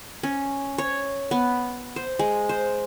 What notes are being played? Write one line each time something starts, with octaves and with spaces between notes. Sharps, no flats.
C#4
C#5
B3
C5
G#3
C5